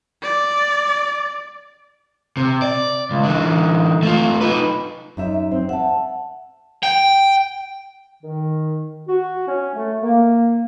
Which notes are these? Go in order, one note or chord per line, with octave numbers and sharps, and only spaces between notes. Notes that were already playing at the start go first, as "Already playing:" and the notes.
D5
C3
D5
C#2
D3 E3
A3 F4
D#4 B4
F#2 D#4 E5
C4
E5 F#5 A5
G5
D#3
F#4
C#4
A3
A#3